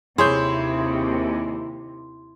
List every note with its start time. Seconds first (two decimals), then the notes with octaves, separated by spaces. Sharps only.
0.18 D#2 C3 E4 G#4 C#5 C6 G6